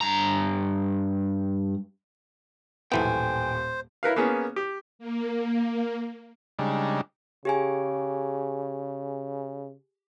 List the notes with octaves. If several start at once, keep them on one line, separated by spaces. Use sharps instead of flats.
G2 A#5
D#1 B1 A2 E3 B3 C5 G5 G#5
E4 A#4 B4 F5
A#3 B3 C#4 G#4
G4
A#3
C#3 G3 G#3 D4 D#4
C#3 G4 G#4 G#5